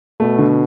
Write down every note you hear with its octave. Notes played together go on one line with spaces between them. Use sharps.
B2 A3
D3